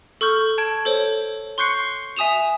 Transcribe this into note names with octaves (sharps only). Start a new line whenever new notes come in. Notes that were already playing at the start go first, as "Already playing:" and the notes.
A4 C#6 F6 G6
A5 G#6 D7
A4 C5 C#5
C6 C#6 F#6 G6 C7 C#7
E5 G#5 D#6 E7 F7